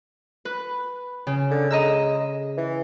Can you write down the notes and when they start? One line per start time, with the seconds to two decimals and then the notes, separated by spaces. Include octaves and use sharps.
0.45 B4
1.27 C#3
1.51 D3
1.70 G#3 D#5 A#5 E6
2.57 E3